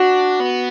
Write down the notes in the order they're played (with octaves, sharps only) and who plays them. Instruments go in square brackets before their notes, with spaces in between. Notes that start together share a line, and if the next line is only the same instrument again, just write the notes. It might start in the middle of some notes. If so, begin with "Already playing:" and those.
Already playing: [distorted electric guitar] D4 [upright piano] F#4
[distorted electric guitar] B3